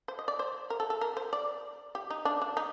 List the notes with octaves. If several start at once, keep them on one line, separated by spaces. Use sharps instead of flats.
C5
D#5
D5
C5
A#4
A4
A4
A#4
C5
D5
G4
D#4
D4
D4
D#4